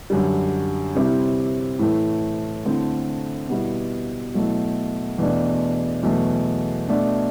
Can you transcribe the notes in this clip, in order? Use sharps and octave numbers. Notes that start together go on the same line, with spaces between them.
F#2 D3 G3
C3 G3 C4 E4
A2 E3 A3
D3 A3 C4 E4
B2 G3 B3 E4
B2 F#3 A3 E4
E2 B2 A3 D4
E2 B2 F#3 A3
B2 A3 D4